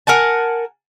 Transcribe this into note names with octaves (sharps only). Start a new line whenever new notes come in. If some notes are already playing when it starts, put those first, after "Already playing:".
A#4 F#5 G#5 A5